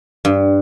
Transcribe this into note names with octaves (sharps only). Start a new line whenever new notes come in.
G2